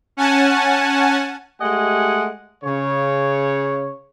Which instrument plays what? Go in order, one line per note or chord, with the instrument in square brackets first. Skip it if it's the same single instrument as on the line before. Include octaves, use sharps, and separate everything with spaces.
[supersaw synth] C#4 F#5 G#5 A5
[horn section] G#3 A3 G4 D#5 F#5 G#5
C#3 C#5